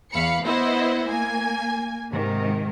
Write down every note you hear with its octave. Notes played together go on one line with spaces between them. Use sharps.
E2 F5 B5 C#7
B3 E4 C5 D#5 E5 F#5
A#3 G#5
G#2 C3 D#3